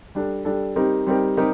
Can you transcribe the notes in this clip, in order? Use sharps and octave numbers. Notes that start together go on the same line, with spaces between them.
G3 D4 A4
G3 D4 A4
G3 C4 D#4 G4 A#4
G3 C4 D#4 G4 A#4
G3 C4 D#4 G4 A#4